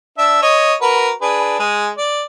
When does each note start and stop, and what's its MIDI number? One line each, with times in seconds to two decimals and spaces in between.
0.18 0.41 62
0.18 0.41 76
0.42 0.74 73
0.42 0.74 75
0.81 1.10 66
0.81 1.10 70
0.81 1.10 71
1.22 1.59 62
1.22 1.59 68
1.22 1.59 71
1.59 1.90 56
1.59 1.90 68
1.97 2.24 74